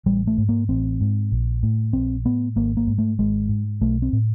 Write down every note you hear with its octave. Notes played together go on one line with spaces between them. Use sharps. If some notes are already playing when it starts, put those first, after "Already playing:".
A1 G3
A3
G#2
A#3
A1 C4
G#2
A#1
A2
A#1 C4
A2 B3
G#1 A#3
A#3
G#2
A3
G#1 G#3
G#2
B1 A3
C4
A2